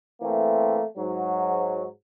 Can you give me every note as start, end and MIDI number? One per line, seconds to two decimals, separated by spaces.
0.21 0.83 52
0.21 0.83 57
0.21 0.83 58
0.21 0.83 60
0.98 1.86 44
0.98 1.86 54